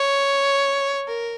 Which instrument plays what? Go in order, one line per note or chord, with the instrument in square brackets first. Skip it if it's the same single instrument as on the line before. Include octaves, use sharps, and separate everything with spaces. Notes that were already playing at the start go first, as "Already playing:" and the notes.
Already playing: [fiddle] C#5
A#4